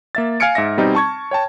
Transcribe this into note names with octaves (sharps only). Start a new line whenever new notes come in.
A#3 E5 A6
F5 G#5 F6 G#6 C#7 D7
G#2 E5 A#6
B2 G3 C4 D#4
A5 C#6 G#6
C#5 G5 A5